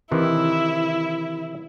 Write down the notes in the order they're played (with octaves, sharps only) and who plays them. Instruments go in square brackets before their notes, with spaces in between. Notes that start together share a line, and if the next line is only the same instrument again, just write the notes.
[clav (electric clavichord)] C3 D#3 E3 [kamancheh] E4